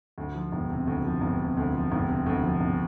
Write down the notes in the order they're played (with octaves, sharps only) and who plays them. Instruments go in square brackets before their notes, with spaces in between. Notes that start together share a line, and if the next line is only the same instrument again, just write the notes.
[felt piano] D2
F3
E1
C3
D2
F3
E1
C3
D2
F3
E1
C3
D2
F3
E1